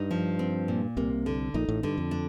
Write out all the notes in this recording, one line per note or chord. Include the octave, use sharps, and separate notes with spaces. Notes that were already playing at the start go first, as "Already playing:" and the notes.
Already playing: G2 D#4
F3
C4
A#2
C2 C3 A#3
D3
A#1 A#2 D#4
A1 A2
G2 D3
F2
D4